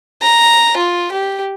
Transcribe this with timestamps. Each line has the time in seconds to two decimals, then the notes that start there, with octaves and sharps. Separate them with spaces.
0.22 A#5
0.77 F4
1.12 G4